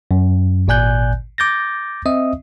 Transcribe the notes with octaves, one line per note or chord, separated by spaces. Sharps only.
F#2
G#1 A#2 D5 G#5 F#6 G6
D6 G6 A6 A#6
C4 D#5 E5 D#6